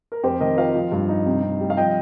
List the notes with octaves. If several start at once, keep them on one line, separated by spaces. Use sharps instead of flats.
A#4
F2 G4 C5
D#3 A#4 D#5
F4 C5 F5
F3
G2
D#4
C3
C3
G3
F5
F3 D#5 G5